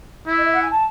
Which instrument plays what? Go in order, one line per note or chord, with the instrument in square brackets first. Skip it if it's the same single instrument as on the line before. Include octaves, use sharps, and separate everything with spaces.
[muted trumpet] E4
[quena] D#5
E5
F#5
G#5
A5